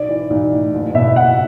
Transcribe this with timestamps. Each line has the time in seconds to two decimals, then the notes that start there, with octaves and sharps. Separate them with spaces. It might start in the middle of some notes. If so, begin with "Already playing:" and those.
Already playing: B1 D5
0.09 E3
0.30 B1
0.52 A2
0.73 F#1
0.95 B2 E5
1.16 F#1 F#5